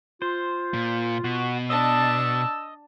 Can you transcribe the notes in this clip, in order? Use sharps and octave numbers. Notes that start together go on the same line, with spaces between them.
F4 C5
A#2
B2 F#4
D4 D#5 A5 E6